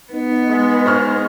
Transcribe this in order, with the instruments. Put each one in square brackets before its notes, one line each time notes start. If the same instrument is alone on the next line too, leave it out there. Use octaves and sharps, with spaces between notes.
[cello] B3 [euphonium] D#4
[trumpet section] G#3
[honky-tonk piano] C5 C#6 F6